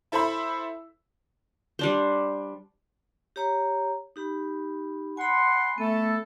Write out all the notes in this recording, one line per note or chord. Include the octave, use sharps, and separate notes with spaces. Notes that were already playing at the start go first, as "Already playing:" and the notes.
E4 A4 C5 E5 B5
G3 D4 C5
G4 C#5 A#5
D#4 G4 B5
F#5 G#5 B5 C6
A3 B3 A4